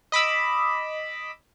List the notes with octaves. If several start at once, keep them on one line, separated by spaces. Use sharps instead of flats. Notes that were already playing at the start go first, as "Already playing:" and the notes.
D#5 B5 D6 E6